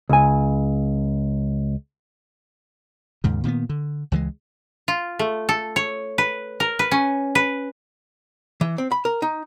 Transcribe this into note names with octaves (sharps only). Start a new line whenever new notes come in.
C#2 G#5
D#2 G#2 C#3
A#2 D#3 A#3 B3
D3
C#2 E3 F#3 G#3
F4
A3
A4
C#5
B4
A#4
B4
C#4
B4
E3
C4
B5
A#4
D#4